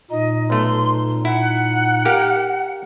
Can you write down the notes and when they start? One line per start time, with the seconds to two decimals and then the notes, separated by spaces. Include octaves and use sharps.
0.11 A#2 D#4 D#5
0.50 B1 A3 C6
1.25 E4 F#5
2.05 A#3 G4 A#4